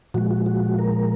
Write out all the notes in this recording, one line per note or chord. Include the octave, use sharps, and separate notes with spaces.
A#2 F3 G#3 F#4
F#4
F#4
A#4